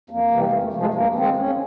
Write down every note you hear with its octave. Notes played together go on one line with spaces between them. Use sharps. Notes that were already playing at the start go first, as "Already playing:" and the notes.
F2 A#3
C3 E3 G3
G#3
F2 A3
A3
C3 F3 G#3 A3
A3
G2 A#3
D#3 G#3 C4
E2 C#4